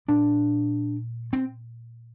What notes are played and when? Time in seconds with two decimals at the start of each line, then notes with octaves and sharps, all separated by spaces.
0.08 A#2 D4
1.33 C4